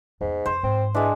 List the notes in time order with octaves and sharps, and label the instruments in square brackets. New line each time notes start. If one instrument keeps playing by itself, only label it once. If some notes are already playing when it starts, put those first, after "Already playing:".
[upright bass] E2 A#3 [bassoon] G#2
[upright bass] F2 [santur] C5
[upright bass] G#2 [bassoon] C4
[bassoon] E3 [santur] G#3 D4